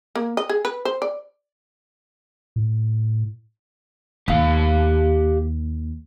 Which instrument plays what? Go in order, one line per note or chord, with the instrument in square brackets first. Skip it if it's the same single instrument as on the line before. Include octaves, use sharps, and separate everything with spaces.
[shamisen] A#3
D#5
G#4
B4
C5
D5
[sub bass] A2
[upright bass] D#2 [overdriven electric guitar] G4 F5